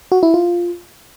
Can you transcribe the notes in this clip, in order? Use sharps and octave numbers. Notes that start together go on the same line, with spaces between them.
F#4
E4
F4